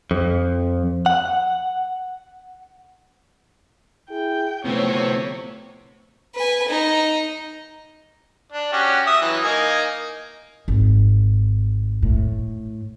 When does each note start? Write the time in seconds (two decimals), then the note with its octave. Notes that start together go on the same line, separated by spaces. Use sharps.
0.11 F2
1.06 F#5
4.10 E4 G#4 G5
4.65 D2 A2 C3 F3 B3 C4 C#5
6.35 B4 G#5
6.68 D#4
8.52 D4
8.73 C#4 F#4 G4
9.06 E5 D#6
9.21 E3 F#3
9.44 A#3 D#4 G#5
10.68 G#1
12.02 A2